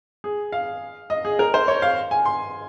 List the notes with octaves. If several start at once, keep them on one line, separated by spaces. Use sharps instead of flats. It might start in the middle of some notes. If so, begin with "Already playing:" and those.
G#4
F5
D#5
G#4
A#4
C5
C#5
F5
G#5
C6